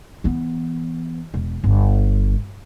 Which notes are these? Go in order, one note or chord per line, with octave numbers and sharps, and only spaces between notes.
E3 B3
E1
G1